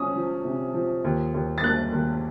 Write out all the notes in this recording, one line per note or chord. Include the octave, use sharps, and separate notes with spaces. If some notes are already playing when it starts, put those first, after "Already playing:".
Already playing: F3 C#4 D#6
F3
C3
F3
D#2
D#2
A6
A#3 F#6
D#2